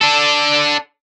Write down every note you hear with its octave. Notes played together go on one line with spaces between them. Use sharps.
D4 A4